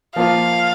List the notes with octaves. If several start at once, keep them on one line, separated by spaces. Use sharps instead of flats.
F3 A#3 F4 F5